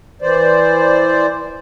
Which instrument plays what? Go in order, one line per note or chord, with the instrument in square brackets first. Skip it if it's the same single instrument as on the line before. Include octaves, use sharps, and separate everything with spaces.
[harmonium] E3 C5 D5